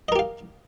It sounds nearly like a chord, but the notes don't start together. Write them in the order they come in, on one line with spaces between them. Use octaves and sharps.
D#5 A#4 G4 F5